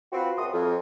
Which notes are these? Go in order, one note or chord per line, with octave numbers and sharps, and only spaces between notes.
C4 F4 F#4 B4
C#2 B2 A#4 E5 C6 D#6
F2